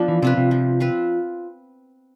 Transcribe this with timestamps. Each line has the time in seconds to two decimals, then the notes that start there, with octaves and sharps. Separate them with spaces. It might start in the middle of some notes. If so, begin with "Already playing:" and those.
Already playing: F3 B3 D4
0.08 E3
0.22 C3 C4 F4 B4
0.37 C3
0.51 F3
0.80 C4 F4 B4